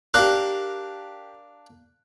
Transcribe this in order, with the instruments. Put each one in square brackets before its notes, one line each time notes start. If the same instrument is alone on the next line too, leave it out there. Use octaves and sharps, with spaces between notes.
[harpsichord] D4 A#4 F5 [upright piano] G4 F#6